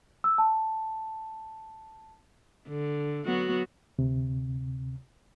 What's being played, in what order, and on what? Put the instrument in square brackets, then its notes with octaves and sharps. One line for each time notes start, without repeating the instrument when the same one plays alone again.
[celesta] E6
A5
[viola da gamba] D3
F#3 B3 F#4
[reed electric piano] D2 C3